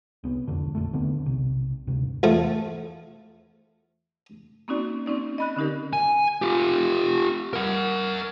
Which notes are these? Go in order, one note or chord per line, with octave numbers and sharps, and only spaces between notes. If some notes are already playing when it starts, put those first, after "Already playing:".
C2 B3
E1 F2 D3
A#1 F2 A3
D#2 D3 B3 C4
B1 C3
D2 G2 C3
E2 F3 A3
A#3 C4 C#4 D#4 F#4 D5
C4 C#4 D#4 D5
D#5 B5 F#6
D3 C#4 D#4 G4 A#4
G#5
F4 G4
A#4 F#5